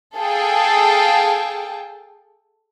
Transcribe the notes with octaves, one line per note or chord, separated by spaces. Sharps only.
G#4 A4 F5 G5 A5